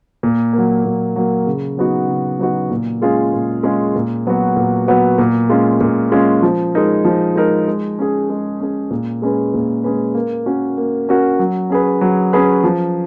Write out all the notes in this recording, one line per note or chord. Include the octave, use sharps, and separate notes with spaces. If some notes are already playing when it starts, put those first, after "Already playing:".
A#2
F#3 A#3
A#2
F#3 A#3
C#3
F#3 B3 D#4 F#4
C#3
F#3 B3 D#4 F#4
A#2
G#3 C#4 F4 G#4
A#2
G#3 C#4 F4 G#4
A#2
F#3 B3 F#4
A#2
F#3 B3 F#4
A#2
G#3 C#4 F4
A#2
G#3 C#4 F4
F3
G#3 D#4 A#4
F3
G#3 D#4 A#4
G#3
C#4 G#4
G#3
C#4 G#4
A#2
G#3 C#4 G#4 B4
A#2
G#3 C#4 G#4 B4
A#3
C#4 F#4 A#4
A#3
C#4 F#4 A#4
F#3
C#4 G#4 B4
F#3
C#4 G#4 B4
F3